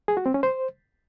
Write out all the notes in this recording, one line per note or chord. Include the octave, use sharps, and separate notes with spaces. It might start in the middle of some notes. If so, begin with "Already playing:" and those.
G#4
F#4
C4
C#4
C5